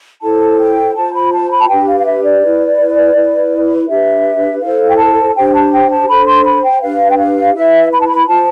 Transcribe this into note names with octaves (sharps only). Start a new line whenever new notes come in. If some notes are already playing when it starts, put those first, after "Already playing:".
E4 A4 C5 A5
G5
F4 C5 A5
B5
A5
B5
A5
D4 G4 B4 G5
F5
F5
E5
D5
E4 B4
E4 B4
D4 G4 B4 E5
E4 A4 C5 F5
G5
A5
D4 G4 C5 G5
A5
G5
A5
D4 A4 C5 B5
C6
B5
G5
D4 G4 B4 F5
G5
F5
E4 B4 E5
B5
A5
B5
F4 C5 A5